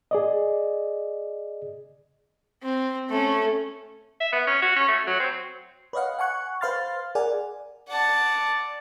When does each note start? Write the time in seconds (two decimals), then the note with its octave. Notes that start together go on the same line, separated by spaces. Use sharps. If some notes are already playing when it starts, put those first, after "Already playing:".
0.11 G#4 D5 D#5
2.63 C4
3.10 A3 C#4
4.20 E5
4.32 B3
4.47 C#4
4.62 F#4
4.76 C#4
4.88 A3
5.07 F#3
5.19 C4
5.93 B4 C#5 D#5 F5 F#5
6.19 F#5 G#5 C#6 F#6
6.61 B4 C5 F5 C6 F6 A6
7.15 G#4 A#4 D5 F#5 G#5
7.89 D5 F#5 A5